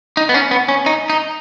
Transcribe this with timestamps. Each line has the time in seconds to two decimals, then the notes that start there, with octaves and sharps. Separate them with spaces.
0.17 D#4
0.29 B3
0.34 C#4
0.51 B3
0.68 C#4
0.86 D#4
1.10 D#4